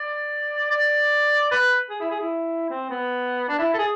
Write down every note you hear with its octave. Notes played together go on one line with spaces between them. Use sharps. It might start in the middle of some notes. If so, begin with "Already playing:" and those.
Already playing: D5
D5
B4
G#4
E4
G#4
E4
C4
B3
D4
E4
A4
G#4